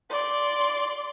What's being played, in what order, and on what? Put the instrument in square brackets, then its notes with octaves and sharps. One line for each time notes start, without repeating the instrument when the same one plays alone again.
[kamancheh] D5 C6